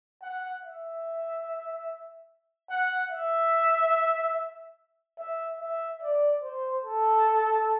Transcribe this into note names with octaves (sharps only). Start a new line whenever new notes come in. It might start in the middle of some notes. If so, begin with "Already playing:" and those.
F#5
E5
F#5
E5
E5
E5
D5
C5
A4